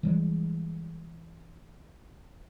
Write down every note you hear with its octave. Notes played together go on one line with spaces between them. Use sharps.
E3 G3 G#3